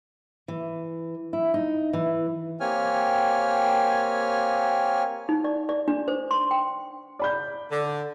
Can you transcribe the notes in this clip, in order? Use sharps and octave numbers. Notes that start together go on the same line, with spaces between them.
E3
E4
D#4
E3
A#3 C4 G4 C#5 G#5 F6
D#4
D5
D5
D4
C5
C6
G5
D5 B5 G6
D3